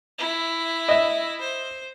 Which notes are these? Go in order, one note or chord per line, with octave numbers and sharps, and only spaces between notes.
E4
D#5 E5
C5